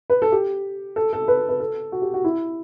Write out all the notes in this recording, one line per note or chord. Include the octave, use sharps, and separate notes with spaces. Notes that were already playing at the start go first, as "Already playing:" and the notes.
B4
A4
G4
A4
A4
B4
B4
A4
F#4
G4
F#4
E4